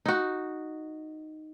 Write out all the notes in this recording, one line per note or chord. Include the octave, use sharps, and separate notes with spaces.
D#4 F#4